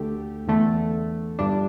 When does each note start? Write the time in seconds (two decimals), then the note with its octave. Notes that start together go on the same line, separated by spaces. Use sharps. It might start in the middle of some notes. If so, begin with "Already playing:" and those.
Already playing: D2 D3 A3 G4
0.47 E2 D3 A3
1.39 G1 G2 G3 D4